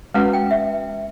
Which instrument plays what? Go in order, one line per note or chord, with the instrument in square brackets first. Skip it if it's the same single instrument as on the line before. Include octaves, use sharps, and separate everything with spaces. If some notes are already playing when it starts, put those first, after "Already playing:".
[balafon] G#3 C#4 F#4 B4 [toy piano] F#5
[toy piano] G5
E5